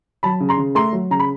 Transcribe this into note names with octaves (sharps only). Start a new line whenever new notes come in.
F#3 A5 B5
C#3
A#5 C6
C#3
A3 A#5 C6
F#3
C#3 A#5
B5